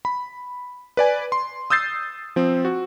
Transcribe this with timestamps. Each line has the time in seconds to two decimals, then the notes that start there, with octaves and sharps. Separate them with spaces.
0.05 B5
0.97 B4 D5 G#5
1.32 C6
1.70 D#6 E6 G6 A6 C7
2.36 F3 C4
2.65 F#4